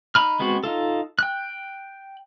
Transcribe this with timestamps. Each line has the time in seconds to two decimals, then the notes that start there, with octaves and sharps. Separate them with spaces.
0.15 D#4 B5 F6
0.39 G#3 B3 C4 F#4
0.64 D#4 F4 A4
1.19 G5 F#6